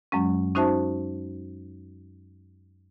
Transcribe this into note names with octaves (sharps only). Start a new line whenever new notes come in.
F#2 F#3 G#3 C#4
C#4 D#4 F#4 C5 E5 A5